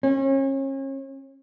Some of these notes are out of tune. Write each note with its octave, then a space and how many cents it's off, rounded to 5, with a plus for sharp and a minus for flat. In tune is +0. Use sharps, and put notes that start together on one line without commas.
C#4 -35